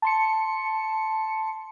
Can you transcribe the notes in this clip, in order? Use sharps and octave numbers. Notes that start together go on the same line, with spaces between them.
A5 C6 C#7